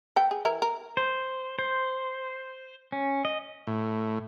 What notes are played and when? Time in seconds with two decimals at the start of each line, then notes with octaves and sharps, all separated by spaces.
0.16 A4 B4 G5
0.31 G#4
0.45 E3 E4 A#4
0.62 A#4
0.97 C5
1.59 C5
2.92 C#4
3.25 D#5
3.67 A2